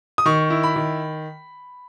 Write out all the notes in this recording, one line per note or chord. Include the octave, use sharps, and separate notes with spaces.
D#6
D#3 C#6
E4
B5
D#3